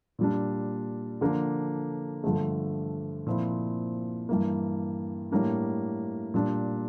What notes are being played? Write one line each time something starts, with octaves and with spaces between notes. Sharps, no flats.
A#2 G3 D4
D3 F3 A#3 D4
G2 D3 F3 A3
A#2 F3 C4 E4
G2 E3 A#3
A2 G3 A#3 D4
A#2 G3 D4